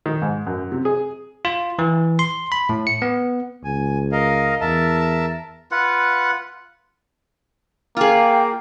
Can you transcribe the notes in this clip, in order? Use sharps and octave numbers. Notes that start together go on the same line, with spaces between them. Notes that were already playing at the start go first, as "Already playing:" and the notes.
D#3
G#2
F#2
C3
G#4
F4
E3
C6
B5
A2
C#7
B3
C#2 G#5
A#4 D#5 F5
E2 A#4 E5 A5
F4 B4 F#5
A#3 F4 G#4 F5 G5 A#5